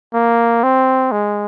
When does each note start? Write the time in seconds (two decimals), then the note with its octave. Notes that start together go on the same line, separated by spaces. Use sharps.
0.14 A#3
0.63 C4
1.12 G#3